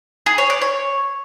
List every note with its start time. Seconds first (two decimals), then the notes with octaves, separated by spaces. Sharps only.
0.26 G#4
0.38 C#5
0.50 D5
0.61 C#5